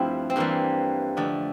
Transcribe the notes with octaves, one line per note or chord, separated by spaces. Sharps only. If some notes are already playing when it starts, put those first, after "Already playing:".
Already playing: G2 F3 A3 C4 E4
C4
G2 E3 G3 A#3
F2 D3 A3